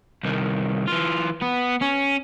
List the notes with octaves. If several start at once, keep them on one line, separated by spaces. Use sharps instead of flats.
C2 D#3
E3 F4
B3
C#4